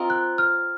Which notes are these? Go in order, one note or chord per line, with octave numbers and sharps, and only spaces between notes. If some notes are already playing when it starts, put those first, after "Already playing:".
Already playing: C4 F4 A#4 D#5
F#6
F6